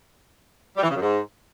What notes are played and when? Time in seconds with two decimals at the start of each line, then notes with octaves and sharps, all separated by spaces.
0.77 G3
0.83 E3
0.89 C#3
0.96 F#2
1.02 G#2